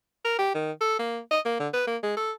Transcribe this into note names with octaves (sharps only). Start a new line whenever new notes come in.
A#4
G4
D#3
A4
A#3
D#5
A#3
D3
B4
A#3
G#3
A4